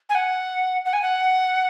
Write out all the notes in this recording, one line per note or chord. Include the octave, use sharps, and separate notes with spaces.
G#5
F#5
F#5
G#5
F#5